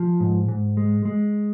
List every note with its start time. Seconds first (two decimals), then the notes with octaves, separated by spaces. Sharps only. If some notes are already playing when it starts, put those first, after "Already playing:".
Already playing: F3
0.20 G#2
0.48 G#2
0.77 G#3
1.05 G#3